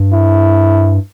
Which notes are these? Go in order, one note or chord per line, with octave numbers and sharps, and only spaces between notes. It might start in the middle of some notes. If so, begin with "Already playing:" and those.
Already playing: G2
E4